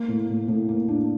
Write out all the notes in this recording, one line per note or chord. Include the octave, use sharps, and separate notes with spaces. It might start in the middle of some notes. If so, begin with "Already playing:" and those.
Already playing: A#3
A2
A2
A2
A#3
D4